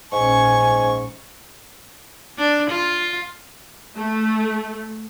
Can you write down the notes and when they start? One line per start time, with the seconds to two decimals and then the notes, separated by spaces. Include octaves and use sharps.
0.13 A#1 G#2 C#4 G#5 C#6
2.38 D4
2.71 F4
3.97 A3